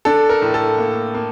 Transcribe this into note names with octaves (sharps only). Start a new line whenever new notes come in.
D4 A4
A#4
A2
A4
A#3
A#3